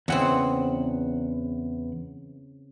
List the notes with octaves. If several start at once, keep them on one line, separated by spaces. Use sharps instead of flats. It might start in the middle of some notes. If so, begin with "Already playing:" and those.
E2 C#3 E3 C4 F#5